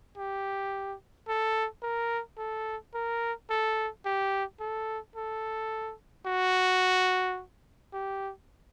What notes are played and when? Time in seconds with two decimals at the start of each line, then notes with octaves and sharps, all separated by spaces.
0.17 G4
1.28 A4
1.82 A#4
2.38 A4
2.94 A#4
3.50 A4
4.05 G4
4.60 A4
5.16 A4
6.26 F#4
7.93 G4